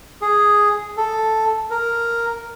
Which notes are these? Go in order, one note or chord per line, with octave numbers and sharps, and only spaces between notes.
G#4
A4
A#4